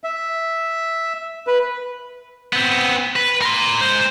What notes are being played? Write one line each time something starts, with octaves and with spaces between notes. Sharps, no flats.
E5
B4
B3 C4
B4
A#4 C6
G#3 C5